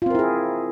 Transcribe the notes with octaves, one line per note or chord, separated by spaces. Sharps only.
C4 E4 F4 G#4 A#4